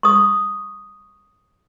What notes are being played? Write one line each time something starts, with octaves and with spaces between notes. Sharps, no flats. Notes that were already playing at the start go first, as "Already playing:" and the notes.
C#6 D#6